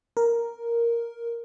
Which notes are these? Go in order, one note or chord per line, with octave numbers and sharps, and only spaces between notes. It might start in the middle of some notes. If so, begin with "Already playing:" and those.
A#4